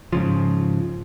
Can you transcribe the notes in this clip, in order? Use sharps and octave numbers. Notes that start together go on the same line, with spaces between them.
G#2 C#3 F3